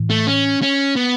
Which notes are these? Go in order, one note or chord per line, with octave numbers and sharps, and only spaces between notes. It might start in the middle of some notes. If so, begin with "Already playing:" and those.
Already playing: A2 E3
A3
C#4
C#4
B3